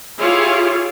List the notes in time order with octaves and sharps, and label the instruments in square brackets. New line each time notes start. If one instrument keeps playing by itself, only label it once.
[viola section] E4 F4 G4 G#4 C#5 F5